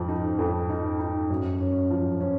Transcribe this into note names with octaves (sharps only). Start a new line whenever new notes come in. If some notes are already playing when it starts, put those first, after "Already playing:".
Already playing: F2 F3
D#4
F2
D#4
D#4
F#2
C#4
F3
C#4